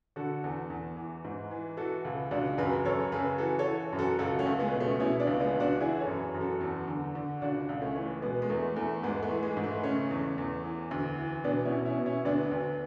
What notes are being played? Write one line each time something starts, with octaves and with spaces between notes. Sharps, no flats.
D3 F#4 A4
E2
E2
E3
G#2
E3
E3 F#4 A4
C#2
C#2 D4 F#4
F#2 G#4 B4
F#2 A4 C#5
C#3 G#4 B4
E3 F#4 A4
A4 C#5
E3
F#2
F#4 A4
C#2 F#4 A4
A3 C#4
C#2
G#3 B3
B2
A3 C#4
B2 C#4 E4
B3 D4
C#2
G#3 B3
C#2
D4 F#4
E3 E4 G#4
A4 C#5
F#2
F#2
F#4 A4
E2
D3
D3
C#2 D4 F#4
C#2
A3 C#4
E3
B2 G#3 B3
G#3
E2 A3
E2 A3
G#2 G#3 B3
A3
E3
G#3
G#2
A3
C#3 A3 C#4
E2
E2
E3
D2
E3
B2 B3 D4
C#4 E4
B2
C#4 E4
B2
C#4 E4
D2 B3 D4
D2